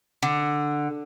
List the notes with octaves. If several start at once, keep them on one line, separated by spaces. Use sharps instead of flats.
D3